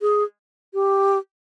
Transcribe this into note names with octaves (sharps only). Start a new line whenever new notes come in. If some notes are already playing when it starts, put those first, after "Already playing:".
G#4
G4